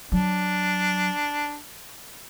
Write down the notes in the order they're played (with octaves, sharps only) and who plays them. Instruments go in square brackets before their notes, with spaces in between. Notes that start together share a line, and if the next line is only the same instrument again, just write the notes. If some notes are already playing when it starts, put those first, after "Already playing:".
[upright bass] F#3 [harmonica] D4